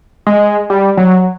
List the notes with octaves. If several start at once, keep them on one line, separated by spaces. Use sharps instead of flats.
G#3
G3
F#3